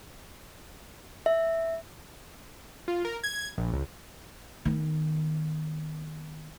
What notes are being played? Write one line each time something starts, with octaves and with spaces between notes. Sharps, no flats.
E5
F4
A#4
G#6
A#1
C#2
D#3 B3